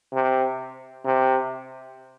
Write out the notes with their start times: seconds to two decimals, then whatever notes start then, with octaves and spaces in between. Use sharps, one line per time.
0.13 C3
1.04 C3